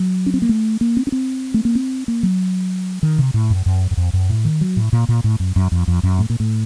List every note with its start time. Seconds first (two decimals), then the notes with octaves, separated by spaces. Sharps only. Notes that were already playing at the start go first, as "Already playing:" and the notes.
Already playing: F#3
0.26 C#4
0.34 C4
0.42 A#3
0.49 A3
0.81 A#3
0.97 C4
1.07 C#4
1.12 C4
1.54 A3
1.65 A#3
1.75 C4
2.08 A#3
2.23 F#3
3.03 D#3
3.18 C3
3.34 A2
3.50 F#2
3.66 F#2
3.91 F#2
3.97 F2
4.13 F#2
4.30 A2
4.45 D#3
4.61 F#3
4.76 A2
4.93 A#2
5.09 A#2
5.24 A2
5.40 F#2
5.56 F#2
5.72 F2
5.88 F2
6.03 F#2
6.19 A2
6.30 A#2
6.40 A2